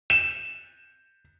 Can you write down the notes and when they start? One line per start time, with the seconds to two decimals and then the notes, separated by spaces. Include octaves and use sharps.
0.10 E7